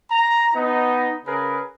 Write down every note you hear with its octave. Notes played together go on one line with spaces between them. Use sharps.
A#5
B3 D#4
C#3 G#4 A#4 B4